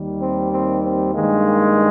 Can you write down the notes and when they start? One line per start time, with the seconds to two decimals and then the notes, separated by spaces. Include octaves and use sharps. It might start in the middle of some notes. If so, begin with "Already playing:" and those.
Already playing: D#2 D#3 G3
0.20 C4
0.51 C4
0.82 C4
1.14 G2 D#3 G#3 A#3